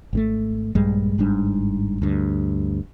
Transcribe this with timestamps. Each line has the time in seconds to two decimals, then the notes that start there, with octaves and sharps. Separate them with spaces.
0.13 G#1 B2 A3
0.75 A#1 G2 G3 G#3
1.18 G1 G#2 G3 D4
2.02 D2 G2